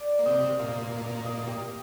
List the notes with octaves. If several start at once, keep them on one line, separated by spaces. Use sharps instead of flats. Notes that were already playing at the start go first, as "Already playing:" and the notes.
Already playing: D5
A#3
C3 C4 D#5
A#2 A#3 F5
D#5
G4